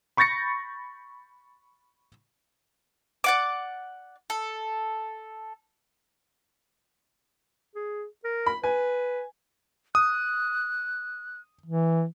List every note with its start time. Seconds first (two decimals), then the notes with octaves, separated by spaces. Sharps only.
0.17 B5 C#6 G6 A6 A#6 C#7
3.24 D5 F#5 D6
4.30 A4
7.75 G#4
8.24 A#4
8.46 B5
8.64 B4 G#5
9.95 D#6 F#6
11.66 E3